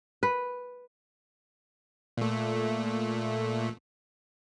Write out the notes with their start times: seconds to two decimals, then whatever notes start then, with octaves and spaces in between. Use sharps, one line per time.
0.23 B4
2.17 A#2 A3